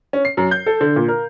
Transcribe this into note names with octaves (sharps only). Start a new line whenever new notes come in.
C#4
C7
F#2
G6
A4
D3
A#2
A#4